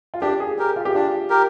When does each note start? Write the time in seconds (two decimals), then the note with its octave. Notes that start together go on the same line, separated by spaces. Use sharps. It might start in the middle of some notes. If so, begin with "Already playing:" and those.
0.14 F4
0.21 D4 G4
0.40 G#4
0.58 G4 G#4 A#4
0.76 F4
0.85 G4
0.94 D4 F4
1.30 G4 A#4